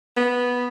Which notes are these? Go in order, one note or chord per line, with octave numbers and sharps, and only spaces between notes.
B3